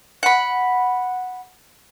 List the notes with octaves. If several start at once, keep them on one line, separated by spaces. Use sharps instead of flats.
F#5 B5